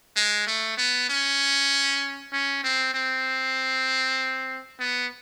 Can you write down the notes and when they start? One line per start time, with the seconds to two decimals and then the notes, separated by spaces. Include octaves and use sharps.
0.16 G#3
0.47 A3
0.78 B3
1.10 C#4
2.33 C#4
2.64 C4
2.94 C4
4.80 B3